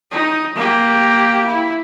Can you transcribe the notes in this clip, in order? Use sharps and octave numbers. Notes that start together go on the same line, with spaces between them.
D#4
A#3 G4
E4